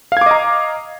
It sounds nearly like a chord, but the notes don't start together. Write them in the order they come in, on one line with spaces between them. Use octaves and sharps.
F5 G#6 D6 D#5 A#5